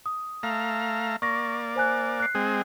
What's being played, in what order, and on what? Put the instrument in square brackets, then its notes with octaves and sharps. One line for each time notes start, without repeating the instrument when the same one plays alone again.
[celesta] D#6
[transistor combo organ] A3 F5 A#5
[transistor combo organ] A#3 D5 [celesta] C#6 A#6
[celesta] C5 G#5 F#6
F#6 C7
[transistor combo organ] G#3 C4 G#4